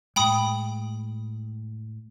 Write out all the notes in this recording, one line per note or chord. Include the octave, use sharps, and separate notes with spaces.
A2 G#3 G5 B5 D#6